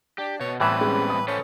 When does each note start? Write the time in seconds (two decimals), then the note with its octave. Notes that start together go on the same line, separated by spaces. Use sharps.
0.18 D4 G4
0.40 B2 C#5
0.60 A2 E3 G3 B3 C4 B4 E5
0.81 G#3 C#4
1.10 D#6
1.28 C#4 A4 B4 C5